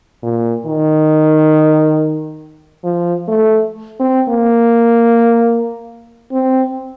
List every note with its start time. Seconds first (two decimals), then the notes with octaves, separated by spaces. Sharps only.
0.23 A#2
0.66 D#3
2.84 F3
3.28 A3
4.00 C4
4.29 A#3
6.32 C4